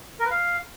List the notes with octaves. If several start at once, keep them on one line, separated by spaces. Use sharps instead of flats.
A#4
B4
F5